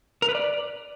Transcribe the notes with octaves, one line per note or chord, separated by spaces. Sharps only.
A#4
B4
D5